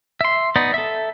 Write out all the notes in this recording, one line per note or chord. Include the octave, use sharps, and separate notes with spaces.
E5 C6
B3 D#4 D5
A4 E5